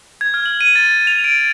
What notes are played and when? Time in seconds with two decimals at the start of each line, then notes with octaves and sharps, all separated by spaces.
0.21 G#6
0.34 F6
0.46 F#7
0.61 D#7
0.75 A6
1.07 F7
1.24 D7